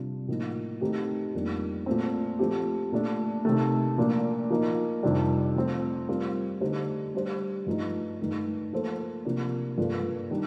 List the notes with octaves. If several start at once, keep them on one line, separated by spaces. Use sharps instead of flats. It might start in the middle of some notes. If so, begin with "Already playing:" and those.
Already playing: C3 G3 D4 F4
A2 F3 A#3 D#4
D#3 A3 C4 D#4 G4
F2 D#3 G3 A#3 D4
A#2 A3 C4
F3 A3 C4 G4
A#2 A3 D4
C3 D#3 A3
A#2 F3 A#3 D4
F3 A#3 D#4
F2 C3 D#3 G3 D4
F3 A3 C4
G3 C4 F4 A#4
D3 A3 D#4 G4 C5
G3 D4 G4 C5
G2 F3 A3 D#4
G2 D#3 A3 D#4
F3 A#3 F4 A4 C5
C3 F3 A#3 D4
G2 F3 A#3 F4 A4
D#3 G3 D4